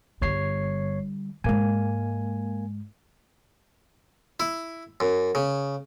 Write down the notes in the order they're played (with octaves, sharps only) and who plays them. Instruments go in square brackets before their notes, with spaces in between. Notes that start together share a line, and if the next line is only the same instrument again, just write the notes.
[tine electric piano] G1 C#5 C7 [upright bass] D3 G3
[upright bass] G#2 G#3 [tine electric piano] A#3 G#5
[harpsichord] E4
F#2
C#3